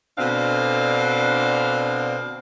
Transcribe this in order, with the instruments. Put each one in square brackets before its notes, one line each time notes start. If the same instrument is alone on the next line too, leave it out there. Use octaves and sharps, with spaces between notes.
[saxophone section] B2 D3 C4 D4 F5